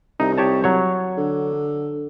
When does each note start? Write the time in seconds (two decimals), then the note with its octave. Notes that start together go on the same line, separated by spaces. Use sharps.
0.20 C2 D#4
0.38 G4 C#5 A5
0.64 F#3 C#5
1.17 D3